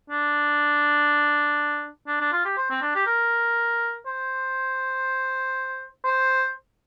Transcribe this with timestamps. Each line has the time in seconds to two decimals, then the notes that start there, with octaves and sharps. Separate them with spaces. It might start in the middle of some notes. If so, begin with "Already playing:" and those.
0.10 D4
2.07 D4
2.20 D4
2.33 F4
2.45 G4
2.57 C5
2.70 C4
2.82 D4
2.95 G4
3.07 A#4
4.07 C5
6.05 C5